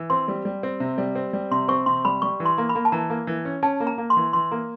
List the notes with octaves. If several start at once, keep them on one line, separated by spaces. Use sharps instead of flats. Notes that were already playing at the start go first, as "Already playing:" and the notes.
Already playing: E3
C4 C6
G3
G3
C4
C3
G3
C4
G3
C3 C6
C4 C#6
C3 C6
G3 B5
G3 C#6
E3
C6
A#3
B5
A#3
A5
E3 A#5
A#3
E3
C#4
C#4 A5
A#3
A#5
A#3
C6
E3
E3 C6
A#3